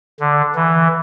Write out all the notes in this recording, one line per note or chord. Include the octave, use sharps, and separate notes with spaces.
D3
E3